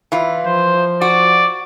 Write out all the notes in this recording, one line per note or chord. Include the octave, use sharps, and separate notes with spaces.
E3 F4
F3 C5
F#4 D5